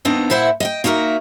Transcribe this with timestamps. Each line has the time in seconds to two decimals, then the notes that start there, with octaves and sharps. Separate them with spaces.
0.05 D#2 B3 C4 D4 D#4
0.30 A#2 E4 C5 E5 F#5
0.60 D#5 F#5 G5
0.84 A#3 D#4 F#4 G4 A#4 E5